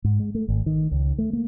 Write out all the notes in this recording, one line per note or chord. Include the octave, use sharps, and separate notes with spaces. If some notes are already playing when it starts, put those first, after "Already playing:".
G#2
G#3
A3
G#1
D#3
C#2
A3
A#3